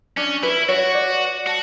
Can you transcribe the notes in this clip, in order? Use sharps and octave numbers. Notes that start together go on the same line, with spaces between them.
C#4 D4
E4 B4
F#4 C#5
D5
F#4 A5